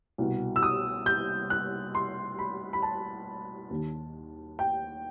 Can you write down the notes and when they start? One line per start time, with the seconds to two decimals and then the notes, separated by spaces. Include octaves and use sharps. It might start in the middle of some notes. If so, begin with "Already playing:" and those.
0.18 C2 B2
0.56 E6
0.63 D#6
1.06 G6
1.50 F#6
1.95 C6
2.39 B5
2.73 B5
2.83 A5
3.71 D#2 D#3
4.59 G5